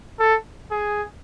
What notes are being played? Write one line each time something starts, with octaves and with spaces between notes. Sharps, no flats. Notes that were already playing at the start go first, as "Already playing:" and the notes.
A4
G#4